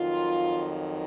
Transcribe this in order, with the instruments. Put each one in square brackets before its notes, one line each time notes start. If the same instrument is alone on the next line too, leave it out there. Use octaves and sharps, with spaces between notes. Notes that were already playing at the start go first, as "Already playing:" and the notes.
Already playing: [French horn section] F2 D#3 F#3 F4